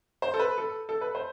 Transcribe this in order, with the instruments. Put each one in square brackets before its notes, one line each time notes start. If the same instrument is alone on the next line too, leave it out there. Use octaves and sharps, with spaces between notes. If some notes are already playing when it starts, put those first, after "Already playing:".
[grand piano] C5
A4
B4
A4
A4
B4
C5